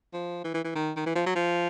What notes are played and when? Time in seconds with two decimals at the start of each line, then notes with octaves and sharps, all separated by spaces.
0.14 F3
0.44 E3
0.54 E3
0.64 E3
0.75 D#3
0.96 D#3
1.06 E3
1.15 F3
1.26 F#3
1.36 F3